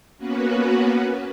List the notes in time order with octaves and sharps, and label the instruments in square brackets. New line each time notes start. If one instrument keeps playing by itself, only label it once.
[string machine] A#3 B3 C#4 F#4 B4